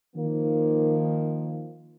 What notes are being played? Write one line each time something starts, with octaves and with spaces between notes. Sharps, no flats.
D#3 F3 A#3